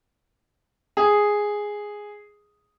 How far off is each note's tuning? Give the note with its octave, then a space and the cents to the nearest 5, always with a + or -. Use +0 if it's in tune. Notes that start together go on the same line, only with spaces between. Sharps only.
G#4 -5